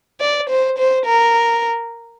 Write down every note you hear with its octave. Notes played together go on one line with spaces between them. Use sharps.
D5
C5
C5
A#4